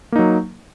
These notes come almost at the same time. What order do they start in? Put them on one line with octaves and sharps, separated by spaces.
A#3 D#4 F#3